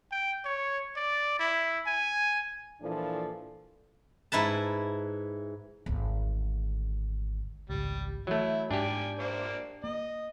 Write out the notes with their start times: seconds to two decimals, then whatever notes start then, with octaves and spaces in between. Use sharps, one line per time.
0.11 G5
0.45 C#5
0.96 D5
1.39 E4
1.86 G#5
2.81 A#2 E3 F3 D4 A4
4.32 G#2 E4 B4 A5
5.86 G#1 D2
7.70 G#1 C#2 G3
8.27 E3 F#3 A3 E4
8.71 G#2 D4 G4 D5 G5 G#5
9.19 A#3 C5 D5
9.84 A#3 D#5